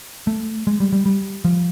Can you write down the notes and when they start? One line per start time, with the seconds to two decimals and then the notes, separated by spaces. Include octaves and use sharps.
0.27 A3
0.67 G#3
0.80 G3
0.93 G3
1.06 G3
1.45 F3